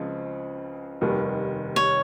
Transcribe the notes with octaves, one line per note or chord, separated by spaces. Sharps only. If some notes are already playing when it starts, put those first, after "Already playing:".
Already playing: C#2 C#3 F3 G#3 C4
F1 D#2 D#3 G3
C#5